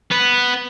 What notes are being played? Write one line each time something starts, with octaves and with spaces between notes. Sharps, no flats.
B3